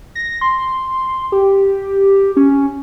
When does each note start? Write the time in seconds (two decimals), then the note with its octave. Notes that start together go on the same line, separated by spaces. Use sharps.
0.15 A#6
0.41 C6
1.32 G4
2.37 C#4